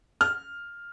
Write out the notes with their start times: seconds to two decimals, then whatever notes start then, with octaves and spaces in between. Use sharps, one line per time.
0.21 F6